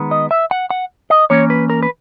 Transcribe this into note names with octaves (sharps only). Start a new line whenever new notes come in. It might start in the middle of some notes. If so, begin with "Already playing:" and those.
Already playing: D#3 G#3 B3
D#5
E5
F#5
F#5
D#5
E3 A#3 C#4 C#5
B4
A#4
B4